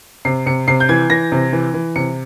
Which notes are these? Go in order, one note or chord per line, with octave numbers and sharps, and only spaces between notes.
C3 C7
C3 C#7
C3 C7
G6
E3 G#6
E3 A#6
C3
E3
E3
C3 C#7